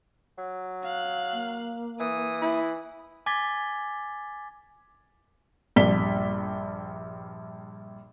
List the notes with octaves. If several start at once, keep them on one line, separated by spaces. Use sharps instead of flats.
F#3
F5 F#6
A#3
E3 D#6
E4
G#5 D6 G#6 A6 B6 G7
A#1 G2 B6 G7